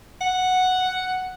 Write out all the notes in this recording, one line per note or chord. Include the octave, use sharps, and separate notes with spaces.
F#5